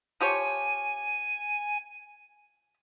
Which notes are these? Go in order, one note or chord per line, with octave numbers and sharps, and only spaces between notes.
F3 G4 C#5 G#5